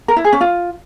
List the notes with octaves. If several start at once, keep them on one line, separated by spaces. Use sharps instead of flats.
A#4
E4
G#4
C#4
F4